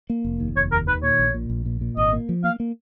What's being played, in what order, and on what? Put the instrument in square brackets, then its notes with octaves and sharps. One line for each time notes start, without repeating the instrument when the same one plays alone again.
[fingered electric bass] A#3
F1
D#2
[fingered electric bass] F1 [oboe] C#5
[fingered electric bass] D#2 [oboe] A#4
[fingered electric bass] D#3 [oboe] B4
[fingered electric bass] A#2 [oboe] C#5
[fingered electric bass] A#1
A#2
A#1
A#2
A#2
[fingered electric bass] G#1 [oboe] D#5
[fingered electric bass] A#3
F3
[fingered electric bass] A#3 [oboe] F5
[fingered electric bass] A#3